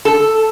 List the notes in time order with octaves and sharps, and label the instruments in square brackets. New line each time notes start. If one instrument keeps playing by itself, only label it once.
[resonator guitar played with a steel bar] A4